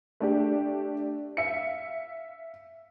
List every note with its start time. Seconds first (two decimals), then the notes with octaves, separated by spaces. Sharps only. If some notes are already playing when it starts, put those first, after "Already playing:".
0.20 A3 D4 G4
1.37 E5 F5 C#7